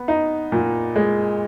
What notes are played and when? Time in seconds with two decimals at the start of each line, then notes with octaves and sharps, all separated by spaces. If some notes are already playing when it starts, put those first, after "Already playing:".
Already playing: B3
0.08 D#4
0.52 A#2
0.96 G#3